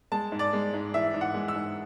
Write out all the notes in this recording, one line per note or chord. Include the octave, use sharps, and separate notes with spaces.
G#3 A5
G#2
D5
G#3
G#2
E3 E5
G#2
F#5
G#3
E6
G#2